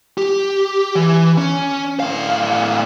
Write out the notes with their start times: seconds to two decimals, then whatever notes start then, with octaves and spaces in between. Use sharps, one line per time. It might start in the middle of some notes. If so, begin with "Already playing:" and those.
0.18 G4
0.95 E3
1.38 C#4
2.00 A2 F5